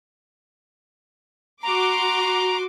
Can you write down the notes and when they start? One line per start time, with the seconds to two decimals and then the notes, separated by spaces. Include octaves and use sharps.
1.63 F#4 A#5 C6 D6